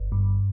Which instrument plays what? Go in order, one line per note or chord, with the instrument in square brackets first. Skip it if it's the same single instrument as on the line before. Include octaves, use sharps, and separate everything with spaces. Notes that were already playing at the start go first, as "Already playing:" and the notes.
Already playing: [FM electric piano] G1
G2